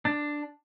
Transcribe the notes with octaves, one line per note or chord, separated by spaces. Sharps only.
D4